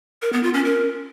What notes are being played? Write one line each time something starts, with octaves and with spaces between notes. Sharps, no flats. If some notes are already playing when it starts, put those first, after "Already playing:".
A#4
B3
F4
C#4
A#4